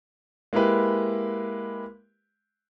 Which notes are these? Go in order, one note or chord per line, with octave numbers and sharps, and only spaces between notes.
G#3 A#3 E4 G4 B4